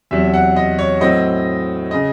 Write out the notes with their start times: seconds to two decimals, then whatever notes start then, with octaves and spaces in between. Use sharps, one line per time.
0.11 E2 C3 F#3 E5
0.34 F#5
0.56 D#5
0.79 C#5
1.01 A2 F#3 C4 D#5
1.91 C#3 D#5